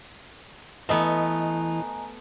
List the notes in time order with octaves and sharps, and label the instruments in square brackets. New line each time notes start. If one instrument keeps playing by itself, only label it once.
[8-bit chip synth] E3 E4 [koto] A3 B3 [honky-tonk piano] D#5 [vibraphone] G#5 A#5